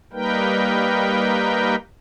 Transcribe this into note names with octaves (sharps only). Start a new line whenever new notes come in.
G3 A#3 D#4 A#4 B4 G5